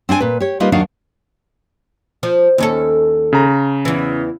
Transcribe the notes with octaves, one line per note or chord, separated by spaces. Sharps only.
C4 D4 E4 G#5
A#2 B4
G4 C#5
G3 A#3 D#4 F4 B4 D#5
D#2 F#3 D4 D#4 F#4 F5
F3
D#2 C#4 A4
C#3 A#5
E2 E3